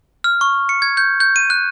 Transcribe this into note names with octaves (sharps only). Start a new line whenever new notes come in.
F6
C#6
C#7
G#6
G6
G6
D#7
F#6